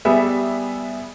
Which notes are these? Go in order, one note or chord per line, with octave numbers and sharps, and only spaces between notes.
G3 B3 G#4 E5